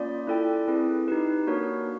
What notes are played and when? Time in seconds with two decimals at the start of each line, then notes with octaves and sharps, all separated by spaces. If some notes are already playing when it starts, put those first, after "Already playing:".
Already playing: A#3 C#4 F4 D5
0.27 E4 A4 D5 G5
0.68 C4 E4 G#4 B4
1.08 D#4 G4 B4
1.47 A#3 D4 F#4 A#4 C#5